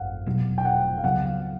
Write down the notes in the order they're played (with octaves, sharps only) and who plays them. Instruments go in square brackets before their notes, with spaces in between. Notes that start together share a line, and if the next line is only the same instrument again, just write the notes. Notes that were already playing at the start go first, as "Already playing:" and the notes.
Already playing: [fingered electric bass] G#1 F#2 [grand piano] F5 F#5
[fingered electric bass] F1 E2 B2 F#3
[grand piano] G5
F#5
F5
[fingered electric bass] C#2 C#3 F#3 B3 [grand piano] F#5
[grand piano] F5